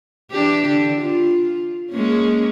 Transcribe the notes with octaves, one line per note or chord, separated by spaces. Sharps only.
E3 D4 G4
D3 D4
F4
G#3 A#3 C#4